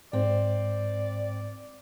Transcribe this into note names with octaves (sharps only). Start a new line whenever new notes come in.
G#2 C4 D5